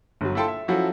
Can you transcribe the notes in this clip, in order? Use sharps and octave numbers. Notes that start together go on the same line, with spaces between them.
G1 F#3
E4 F4 A4 G5 A5 C6
E5
F3 F#3 C#4 E4 F#4 A4